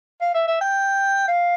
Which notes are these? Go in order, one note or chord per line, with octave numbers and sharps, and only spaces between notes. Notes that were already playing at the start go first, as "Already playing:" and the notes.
F5
E5
E5
G5
F5